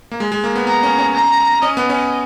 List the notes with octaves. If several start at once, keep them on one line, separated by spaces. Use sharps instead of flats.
A#3
G#3
G#3
A#3
B3
B3 A#5
C#4
C#4
A#5
C#4 D#5
B3
C#4